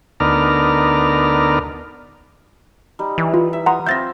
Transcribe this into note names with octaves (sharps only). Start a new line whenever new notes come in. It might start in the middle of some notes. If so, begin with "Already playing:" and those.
D2 B3 D#4 A#4 D5 F6
G3 D#4
E3
F4
E5
F#5 A#5 C6 D#6
C4 F4 E5 G6 A6 A#6